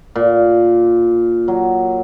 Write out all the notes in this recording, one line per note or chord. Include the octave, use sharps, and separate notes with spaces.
A#2
F#3